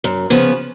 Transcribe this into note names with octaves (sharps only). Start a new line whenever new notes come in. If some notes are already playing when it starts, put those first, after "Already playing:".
F#2
C#3 F3 B3